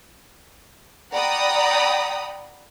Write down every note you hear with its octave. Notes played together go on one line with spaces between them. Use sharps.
D5 F#5 G5 A#5 B5 D#6